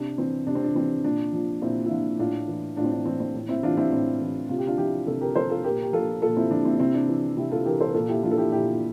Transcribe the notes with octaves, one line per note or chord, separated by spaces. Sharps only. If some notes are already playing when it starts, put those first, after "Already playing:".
Already playing: C3 D4
E3 C4
C3 D4
C4
D4
E3 C4
A#2 D4
F3
A#2 C4 E4
E4
F3 D4 F4
A2 D4 F4
E3
A2 D4 F4
C4
D4
E3 C4
C4
A2
C4 E4
E3 D4 F4
C4 E4
A2 C4 E4
E3
C3 F4
G4
D4 F4
F3 E4 G4
C3 F4 A4
G4 A#4
F3 A4 C5
F4 A4
A#2 G4 A#4
G4
F3 F4 A4
A#2 F4 A4
C4 E4
F3 D4
C4 E4
D4
C3 C4 E4
D4
E3
C3 E4 G4
F4 A4
E3 G4 A#4
A4 C5
A#4
A#2 F4 A4
E4 G4
F3 D4 F4
A4
E4 G4
A#2 E4 G4